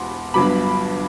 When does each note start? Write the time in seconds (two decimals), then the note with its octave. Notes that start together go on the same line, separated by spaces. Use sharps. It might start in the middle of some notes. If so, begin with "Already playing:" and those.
Already playing: E1 E2 B2 F#5 B5 C6 D6
0.34 G1 G2 F#3 B3 B5 D6